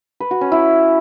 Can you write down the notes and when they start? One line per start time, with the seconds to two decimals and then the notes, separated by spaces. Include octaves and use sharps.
0.20 B4
0.31 F#4
0.41 C#4
0.52 E4